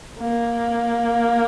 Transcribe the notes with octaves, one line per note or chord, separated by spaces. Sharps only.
A#3